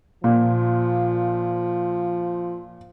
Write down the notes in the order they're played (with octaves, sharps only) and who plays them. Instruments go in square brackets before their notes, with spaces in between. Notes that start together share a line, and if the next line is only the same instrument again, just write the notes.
[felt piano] A#2 [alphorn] F3